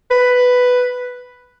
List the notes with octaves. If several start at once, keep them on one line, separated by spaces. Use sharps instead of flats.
B4